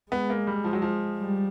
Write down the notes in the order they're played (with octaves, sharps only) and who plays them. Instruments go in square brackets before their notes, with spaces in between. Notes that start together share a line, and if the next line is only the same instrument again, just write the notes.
[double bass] G#3 [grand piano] B3
[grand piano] A#3
G3
F3
F#3
F3
[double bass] G3